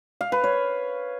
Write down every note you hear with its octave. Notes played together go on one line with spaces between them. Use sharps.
F5
B4
C#5